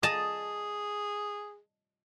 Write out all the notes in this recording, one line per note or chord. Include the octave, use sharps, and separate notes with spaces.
G#4 D#5 A5